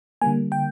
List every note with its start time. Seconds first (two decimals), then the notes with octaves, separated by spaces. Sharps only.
0.21 D3 G3 A#3 G#5
0.52 G5